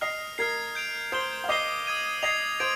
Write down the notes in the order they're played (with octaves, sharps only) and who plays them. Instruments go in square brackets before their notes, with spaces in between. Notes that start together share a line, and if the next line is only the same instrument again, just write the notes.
[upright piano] D#5 [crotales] F6 C7 F7
[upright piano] A#4 [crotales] F6 G#6 C7
[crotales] G6 D7 F7
[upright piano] C5 [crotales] D#6 G#6 C7 G7
[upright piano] F5
[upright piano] D#5 [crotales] D6 G6 C7 D#7 G7
[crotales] D#6 G#6 D#7 G7
[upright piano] D#5 [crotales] G#6 C7 F7
[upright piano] C5 [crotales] G#6 D7